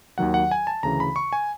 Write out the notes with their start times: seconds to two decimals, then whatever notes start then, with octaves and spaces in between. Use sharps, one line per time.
0.18 D#2 D#3 F#3 F#5
0.34 F#5
0.51 G#5
0.67 A5
0.83 D2 C#3 E3 A#5
1.00 B5
1.16 C#6
1.33 G#5